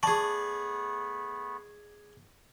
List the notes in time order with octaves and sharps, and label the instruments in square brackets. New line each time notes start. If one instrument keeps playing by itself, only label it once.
[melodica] A3 B3 [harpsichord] G#4 D5 [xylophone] A5 C#6